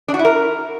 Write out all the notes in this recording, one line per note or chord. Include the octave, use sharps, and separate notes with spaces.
D4
F#4
E4
A#4